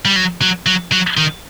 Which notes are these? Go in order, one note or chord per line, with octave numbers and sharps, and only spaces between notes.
G3
F#3
F#3
F#3
F#3
D#3